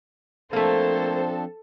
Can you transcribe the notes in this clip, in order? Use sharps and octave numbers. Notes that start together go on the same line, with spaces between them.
F3 A3 A#3 C4 D4 A4 C5